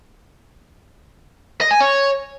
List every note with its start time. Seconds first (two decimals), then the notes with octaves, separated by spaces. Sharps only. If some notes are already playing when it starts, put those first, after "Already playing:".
1.61 D#5
1.71 G#5
1.80 C#5